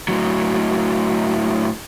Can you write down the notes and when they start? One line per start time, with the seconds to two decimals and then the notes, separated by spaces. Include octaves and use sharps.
0.08 A2 F#3